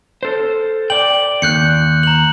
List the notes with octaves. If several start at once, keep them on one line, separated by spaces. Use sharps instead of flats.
A4 C5
D5 G5 F#7
D#2 F#6 G6 C#7
A#5 F#7